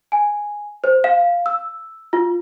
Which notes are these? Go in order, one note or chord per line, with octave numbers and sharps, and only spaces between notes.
G#5
C5
F5
E6
F4